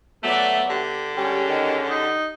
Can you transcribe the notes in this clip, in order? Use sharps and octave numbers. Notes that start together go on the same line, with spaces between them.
F#3 A3 B3 D5 E5
D3 G4
G3 G#3 C#4 G4
D#3
D#4